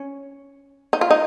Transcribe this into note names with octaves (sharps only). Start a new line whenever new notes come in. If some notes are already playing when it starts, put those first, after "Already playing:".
Already playing: C#4
D#4
F4
D#4